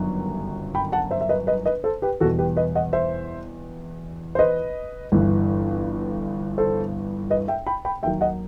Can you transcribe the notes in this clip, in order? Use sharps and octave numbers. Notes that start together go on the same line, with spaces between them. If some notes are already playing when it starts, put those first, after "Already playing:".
Already playing: G1 F#2 D#3 F#3
G5 B5
F#5 A5
C5 E5
E5
B4 D#5
B4 D#5
B4 D#5
A4 C5
G4 B4
E2 B2 G3 F#4 A4
G4 B4
B4 D#5
D#5 F#5
C5 E5
C5
B4 D#5
G1 G2 E3
A4 C5
B4 D#5
E5 G5
G5 B5
G5 B5
D#2 D#3 F#3 E5 G5
D#5 F#5